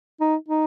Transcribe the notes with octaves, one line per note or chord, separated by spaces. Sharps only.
D#4
D#4